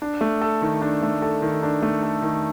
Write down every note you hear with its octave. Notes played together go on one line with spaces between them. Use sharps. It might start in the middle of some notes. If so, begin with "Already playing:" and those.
D4
A3
A4
D#3
D4
A3
A4
D#3
D4
A3
A4
D#3